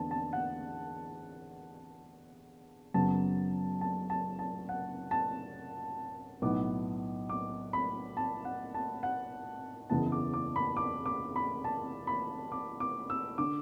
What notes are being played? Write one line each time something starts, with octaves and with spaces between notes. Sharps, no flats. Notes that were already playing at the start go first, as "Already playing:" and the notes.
Already playing: E2 D3 B3 A5
A5
F#5
F#1 F#2 F#3 B3 A5
A5
A5
A5
F#5
A5
B1 A2 F#3 B3 D6
D6
B5
A5
F#5
A5
F#5
F#1 E2 E3 B3 A5
D6
D6
B5
D6
D6
B5
A5
B5
D6
D6
E6
D3 D6